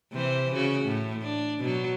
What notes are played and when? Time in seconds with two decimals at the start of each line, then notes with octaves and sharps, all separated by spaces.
0.12 C3 E3 C5
0.54 C#3 F#4
0.85 A2
1.22 D4
1.59 B2 F#3